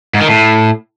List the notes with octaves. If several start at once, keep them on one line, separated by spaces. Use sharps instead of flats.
G#2
D#3
A2